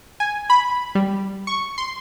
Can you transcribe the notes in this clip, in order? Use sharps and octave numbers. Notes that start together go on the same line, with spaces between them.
G#5
B5
G3
C#6
C6